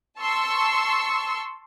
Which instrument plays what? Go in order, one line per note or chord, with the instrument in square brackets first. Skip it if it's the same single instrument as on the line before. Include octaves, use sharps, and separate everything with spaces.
[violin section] A5 C6 C#6 E6